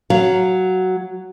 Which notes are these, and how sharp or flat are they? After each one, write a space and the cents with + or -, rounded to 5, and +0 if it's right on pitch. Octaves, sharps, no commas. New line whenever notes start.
F#3 +5 F5 +0